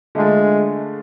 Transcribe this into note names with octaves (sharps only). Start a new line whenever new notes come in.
D3 G#3 A3 D4 F4